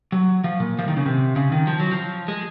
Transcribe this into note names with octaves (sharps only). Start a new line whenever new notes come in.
F#3
F3
A#2
F3
D#3
C#3
C3
C#3
D#3
F3
F#3
F3
G#3